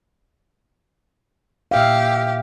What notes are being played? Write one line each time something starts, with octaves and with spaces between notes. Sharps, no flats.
A#2 G4 E5 F5